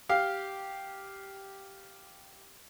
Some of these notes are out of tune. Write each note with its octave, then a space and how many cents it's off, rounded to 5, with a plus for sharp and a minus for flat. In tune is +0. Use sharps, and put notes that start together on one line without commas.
G4 -5 F5 +0